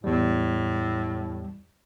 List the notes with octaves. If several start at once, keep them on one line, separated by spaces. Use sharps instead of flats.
E2 A2 G3